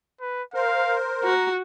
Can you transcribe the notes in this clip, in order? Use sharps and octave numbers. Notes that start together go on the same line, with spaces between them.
B4
A#4 C5 F5
F#4 A#5